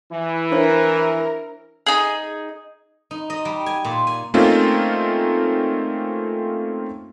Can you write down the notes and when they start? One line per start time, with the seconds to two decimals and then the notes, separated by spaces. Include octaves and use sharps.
0.12 E3 E4
0.52 D4 A#4 C5 C#5
1.86 D#4 G#4
3.11 D#4
3.30 D#5
3.45 G3
3.66 G#5
3.85 A#2
4.07 G#5
4.34 A3 A#3 C4 C#4 D#4 F4